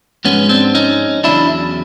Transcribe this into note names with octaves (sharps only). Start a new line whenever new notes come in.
G#2 F3 G#3 B3 C#4
C4 D4
C#4 D#4
E2 C#3 F#3 D4 E4